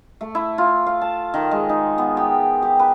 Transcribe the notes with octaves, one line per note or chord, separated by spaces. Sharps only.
A3
E4
F4
F5
A5
D#3
G#3
D#4
B3
G4
G4
B4